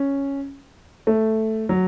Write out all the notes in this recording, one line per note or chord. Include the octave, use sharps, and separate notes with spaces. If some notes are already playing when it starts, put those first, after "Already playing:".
Already playing: C#4
A3
F#3